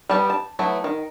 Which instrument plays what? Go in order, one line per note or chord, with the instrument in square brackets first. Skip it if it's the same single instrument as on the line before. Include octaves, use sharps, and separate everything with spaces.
[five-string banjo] G3 B3 G4 A5
A5
F#3 A3 B3 E4
D#3